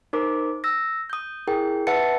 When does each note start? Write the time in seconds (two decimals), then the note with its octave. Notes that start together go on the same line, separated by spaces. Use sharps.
0.13 D#4 A#4 C5 D6
0.64 E6 A#6
1.10 D#6 G6
1.47 E4 G#4 A#4 G5
1.87 B4 E5 F#5 A5 A6 C#7